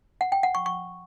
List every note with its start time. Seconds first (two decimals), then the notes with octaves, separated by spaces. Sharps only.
0.21 F#5
0.32 G5
0.43 F#5
0.55 C#6
0.66 C#6